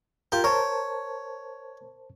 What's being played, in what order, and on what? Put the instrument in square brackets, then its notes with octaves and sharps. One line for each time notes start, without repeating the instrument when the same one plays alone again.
[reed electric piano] F4 A#4 [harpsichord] G4
[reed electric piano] A#4 C5 A5 [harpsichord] C#5